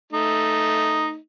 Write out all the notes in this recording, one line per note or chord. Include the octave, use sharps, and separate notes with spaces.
A3 D#4